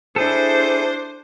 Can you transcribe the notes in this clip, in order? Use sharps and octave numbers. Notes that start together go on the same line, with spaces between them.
D4 E4 G#4 A4 C5